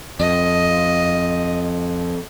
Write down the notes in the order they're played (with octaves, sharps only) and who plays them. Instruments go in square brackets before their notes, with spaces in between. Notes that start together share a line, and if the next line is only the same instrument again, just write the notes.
[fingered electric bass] F2 [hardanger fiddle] D#5